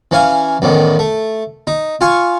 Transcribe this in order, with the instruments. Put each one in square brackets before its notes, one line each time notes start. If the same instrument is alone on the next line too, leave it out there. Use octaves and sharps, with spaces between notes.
[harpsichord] E3 C#4 F5 G#5
A1 E2 A2 D#3
A3
D#4
F4 F5 G#5 C#6